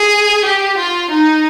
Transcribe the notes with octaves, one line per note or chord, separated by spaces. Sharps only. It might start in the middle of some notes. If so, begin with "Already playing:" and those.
Already playing: G#4
G4
F4
D#4